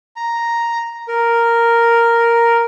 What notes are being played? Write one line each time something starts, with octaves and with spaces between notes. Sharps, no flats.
A#5
A#4